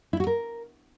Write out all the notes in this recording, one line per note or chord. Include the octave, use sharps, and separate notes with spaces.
E4
F#4
A#4